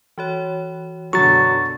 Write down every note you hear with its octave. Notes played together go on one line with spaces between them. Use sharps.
E3 F#4 C#5
F#2 B2 D3 F#3 C#6 A6